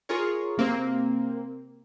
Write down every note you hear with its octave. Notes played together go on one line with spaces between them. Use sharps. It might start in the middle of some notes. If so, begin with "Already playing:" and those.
F4 G#4 A#4 C#5
C3 A#3 C4